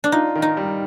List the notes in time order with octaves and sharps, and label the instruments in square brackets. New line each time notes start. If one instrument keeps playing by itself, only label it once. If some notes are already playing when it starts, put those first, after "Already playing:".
[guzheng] D4
[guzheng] D#4 [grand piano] F4
[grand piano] D#3
[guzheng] D#4
[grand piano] G3